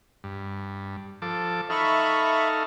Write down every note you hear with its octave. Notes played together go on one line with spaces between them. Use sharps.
G2
F3 A4 D6
D#4 A4 E5 F5 B5 C#6